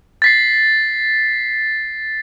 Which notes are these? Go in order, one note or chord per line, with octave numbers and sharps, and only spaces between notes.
A6 B6 C7